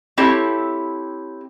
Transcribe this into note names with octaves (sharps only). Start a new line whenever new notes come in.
C4 E4 G4 A4 C#5